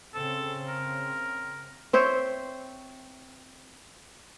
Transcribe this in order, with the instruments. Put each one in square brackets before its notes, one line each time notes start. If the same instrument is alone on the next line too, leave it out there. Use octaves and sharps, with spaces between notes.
[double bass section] C#3 C4 [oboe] A4
[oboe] A#4
[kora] C4 C5 C#5 E5